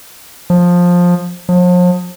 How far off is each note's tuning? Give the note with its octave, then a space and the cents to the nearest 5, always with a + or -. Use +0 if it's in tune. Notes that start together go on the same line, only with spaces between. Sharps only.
F3 +15
F3 +40